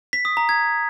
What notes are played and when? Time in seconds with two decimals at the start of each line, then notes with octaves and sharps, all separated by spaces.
0.13 B6
0.25 D#6
0.37 A#5
0.49 G#6